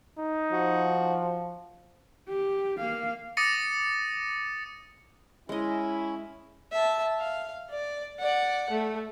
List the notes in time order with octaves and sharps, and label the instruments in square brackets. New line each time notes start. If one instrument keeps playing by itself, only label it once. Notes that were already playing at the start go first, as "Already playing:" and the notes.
[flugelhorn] D#4
[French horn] F3 [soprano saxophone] F#4
[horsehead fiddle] G4
A#3 F5
[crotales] D6 D#6 A6 A#6 C#7 D#7
[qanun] G#3 D#5 [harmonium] C#4 [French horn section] E4
[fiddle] E5 A5
F5
D5
D5 F#5
A3